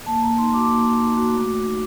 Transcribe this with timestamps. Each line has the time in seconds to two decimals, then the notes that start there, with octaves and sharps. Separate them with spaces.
0.06 A#3 A5
0.22 A#3 A#5
0.37 D#4 C6
0.53 F#4 D6
0.69 A#3
0.86 A#3
1.01 D#4
1.17 F#4
1.33 A3
1.48 A3
1.65 D#4